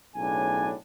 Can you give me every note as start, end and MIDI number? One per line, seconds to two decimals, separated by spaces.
0.16 0.73 35
0.16 0.73 45
0.16 0.73 49
0.16 0.73 62
0.16 0.73 80